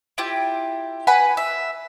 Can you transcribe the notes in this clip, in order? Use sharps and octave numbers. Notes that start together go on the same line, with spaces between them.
E4 F4 G4
B4 F#5 G#5 B5
E5